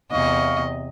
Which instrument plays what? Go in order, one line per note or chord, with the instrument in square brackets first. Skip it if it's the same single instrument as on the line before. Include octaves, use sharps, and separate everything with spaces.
[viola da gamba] E2 C3 D#5 [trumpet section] F5 C#6